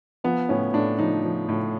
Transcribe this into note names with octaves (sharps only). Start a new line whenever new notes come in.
F3 B3
A2 C#4
A2 D4
F3 D#4
F3
A2